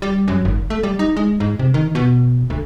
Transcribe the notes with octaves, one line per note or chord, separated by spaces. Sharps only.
G3
F#2
G#1
A3
G3
D#4
G#3
G#2
C3
D#3
B2
D2